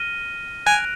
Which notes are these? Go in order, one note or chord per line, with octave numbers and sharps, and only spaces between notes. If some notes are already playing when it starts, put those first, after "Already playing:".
Already playing: F6 A#6 D#7 G7
G#5 F#6 A#6 D7 F7